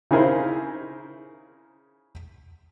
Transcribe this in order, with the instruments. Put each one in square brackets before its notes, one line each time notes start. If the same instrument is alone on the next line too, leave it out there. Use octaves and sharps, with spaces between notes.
[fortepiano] C#3 D#4 E4 G#4 A#4 C5